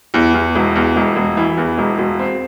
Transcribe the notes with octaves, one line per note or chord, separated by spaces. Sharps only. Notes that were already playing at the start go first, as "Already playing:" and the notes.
E2
E2
E1
E2
E1
E1
E3
E2
E1
E1
C4